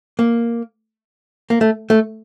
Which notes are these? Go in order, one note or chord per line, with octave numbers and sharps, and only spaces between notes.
A#3
A#3
A3
A3